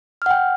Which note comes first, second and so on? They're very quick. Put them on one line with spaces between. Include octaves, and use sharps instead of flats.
F6 F#5 G5